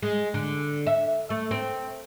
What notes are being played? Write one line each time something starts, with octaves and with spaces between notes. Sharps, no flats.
G#3
D3
E5
A3
C4